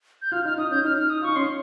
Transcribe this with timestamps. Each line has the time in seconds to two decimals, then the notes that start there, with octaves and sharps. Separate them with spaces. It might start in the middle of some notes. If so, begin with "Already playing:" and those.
0.22 G6
0.32 F4 F6
0.45 D#4 F6
0.58 D#4 D#6
0.71 C#4 G6
0.84 D#4 F6
0.97 F6
1.10 D#6
1.21 F4 C#6
1.29 D#4
1.36 C#4 C6